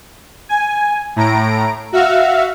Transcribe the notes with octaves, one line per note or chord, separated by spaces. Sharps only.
G#5
A2 A#5 D7
F#4 E5 F5